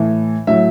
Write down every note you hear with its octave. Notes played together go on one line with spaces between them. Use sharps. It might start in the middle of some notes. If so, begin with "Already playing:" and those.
Already playing: A2 E3
A2 F#3 E5